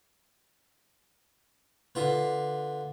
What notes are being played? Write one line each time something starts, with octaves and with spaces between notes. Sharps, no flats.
D3 F4 B4